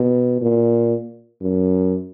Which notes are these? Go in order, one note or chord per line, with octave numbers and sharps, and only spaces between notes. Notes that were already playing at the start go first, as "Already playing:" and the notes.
Already playing: B2
A#2
F#2